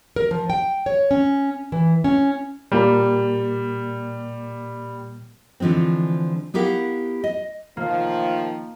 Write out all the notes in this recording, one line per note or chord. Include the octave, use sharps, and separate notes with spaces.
A#4
F3
G5
C#5
C#4
E3
C#4
A#2 G3 A#3
D3 E3 F3 G#3 C4
B3 E4 G4 A#4 F5 F#5
D#5
D#3 F3 A#3